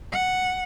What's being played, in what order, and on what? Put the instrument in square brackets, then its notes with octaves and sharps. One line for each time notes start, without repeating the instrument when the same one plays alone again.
[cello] F#5